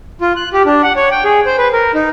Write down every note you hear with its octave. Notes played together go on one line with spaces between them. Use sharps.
F4
F#6
G4
D4
F#5
C#5
G5
G#4
C5
B4
A#4
D#4